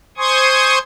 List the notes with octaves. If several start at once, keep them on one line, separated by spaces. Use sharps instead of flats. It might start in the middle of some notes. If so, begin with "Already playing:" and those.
C5 G#5 C6 C#6 D#6 G#6